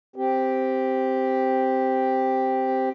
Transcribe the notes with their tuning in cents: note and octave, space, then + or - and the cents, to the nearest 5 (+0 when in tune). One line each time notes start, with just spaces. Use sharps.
C4 +0 G4 +0